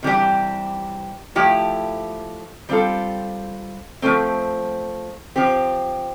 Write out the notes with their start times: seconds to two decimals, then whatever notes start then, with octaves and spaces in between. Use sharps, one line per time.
0.03 C3 E3 G3 D4 G4
1.35 F3 A3 E4 G4
2.69 G3 C4 F4 A4
4.02 F3 A3 C4
5.36 F3 C4 G4